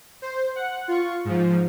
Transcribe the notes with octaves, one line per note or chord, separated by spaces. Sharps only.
C5
F#5
F4 C#6
G#2 F3